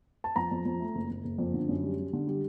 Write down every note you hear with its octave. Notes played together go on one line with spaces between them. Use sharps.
A5
F2 A#5
F2
F2
A3
F#1
F#1
F#1
F2
D3
F#2
G3
G3
D3
G3